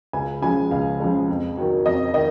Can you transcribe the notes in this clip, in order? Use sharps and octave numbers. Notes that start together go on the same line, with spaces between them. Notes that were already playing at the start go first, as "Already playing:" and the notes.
C#2 G#5
C#3 F3 G#3 G#5
C#2 F5
C#3 F3 G#3
F2
D#3 F#3
F2 D#5
D#3 D#5